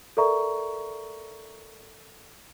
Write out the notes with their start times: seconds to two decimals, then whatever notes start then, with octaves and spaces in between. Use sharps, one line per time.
0.17 A4 A#4 D5 E5 A#5 C#6